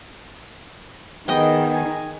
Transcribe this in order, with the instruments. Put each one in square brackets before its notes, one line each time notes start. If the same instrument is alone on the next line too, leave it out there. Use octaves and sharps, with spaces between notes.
[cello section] D#3 [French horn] B3 [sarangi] G#4 [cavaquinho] D#5 G5
[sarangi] G#5